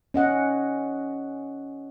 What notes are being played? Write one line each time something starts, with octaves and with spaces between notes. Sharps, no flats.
C#4 D#5 F#5